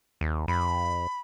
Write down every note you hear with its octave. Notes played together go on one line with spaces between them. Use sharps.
D#2
F2 B5